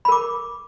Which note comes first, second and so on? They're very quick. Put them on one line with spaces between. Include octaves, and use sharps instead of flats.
B5 A#4 D6